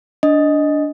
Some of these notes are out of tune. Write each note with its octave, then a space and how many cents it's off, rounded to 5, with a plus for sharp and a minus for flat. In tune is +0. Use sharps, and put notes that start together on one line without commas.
D4 -10 D#5 +0